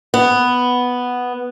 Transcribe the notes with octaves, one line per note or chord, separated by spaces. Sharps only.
B3